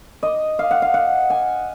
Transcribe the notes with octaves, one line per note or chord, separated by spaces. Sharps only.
D#5
F5
F#5
F5
F#5
G#5